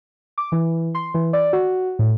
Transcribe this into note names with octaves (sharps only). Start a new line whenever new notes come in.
D6
E3
C6
E3
D5
F#4
A2